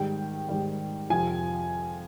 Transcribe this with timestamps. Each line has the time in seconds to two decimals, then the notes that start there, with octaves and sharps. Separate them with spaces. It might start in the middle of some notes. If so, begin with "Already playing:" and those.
Already playing: G#2 D#3 G3 G5
0.49 G#2 D#3 G3
1.10 F2 C3 F3 G#5